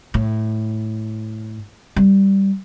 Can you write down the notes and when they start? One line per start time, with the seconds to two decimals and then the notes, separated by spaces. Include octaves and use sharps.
0.14 A2
1.96 G3